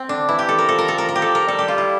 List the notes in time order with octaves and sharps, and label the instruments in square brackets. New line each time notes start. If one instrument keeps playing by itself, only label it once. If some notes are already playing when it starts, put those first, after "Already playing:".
Already playing: [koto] C4
[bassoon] D3 [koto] D4
[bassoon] E3 [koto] E4
[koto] G4
A4
A#4
[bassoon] F3 [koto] A4
[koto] A#4
A4
A#4
A#4
G4
A4
A#4
[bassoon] G3 [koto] A4
[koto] G4
F4
E4